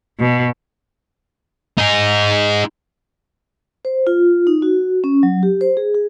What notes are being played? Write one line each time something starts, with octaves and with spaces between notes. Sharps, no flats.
B2
D#4 G#4
C5
F4
D#4
F#4
C#4
F#3
G4
C5
G#4
G#4